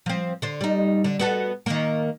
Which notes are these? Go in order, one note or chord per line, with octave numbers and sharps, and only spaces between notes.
F3 C4
D3 C5
G3 D#4
D3
B3 F#4 A4
D#3 A#3